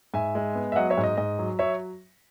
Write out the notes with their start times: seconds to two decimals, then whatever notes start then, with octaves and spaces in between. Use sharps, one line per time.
0.14 G#2 E5 G#5
0.35 G#3
0.55 B3
0.72 E5
0.76 F#3 D#5 F#5
0.90 C#5 E5
0.97 G#2
1.04 D#5
1.17 G#2 D#5
1.39 F#3
1.59 F#3 C#5 E5